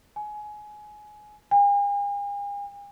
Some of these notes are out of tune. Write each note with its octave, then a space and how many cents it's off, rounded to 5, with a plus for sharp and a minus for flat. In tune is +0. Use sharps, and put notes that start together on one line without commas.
G#5 +20
G#5 -45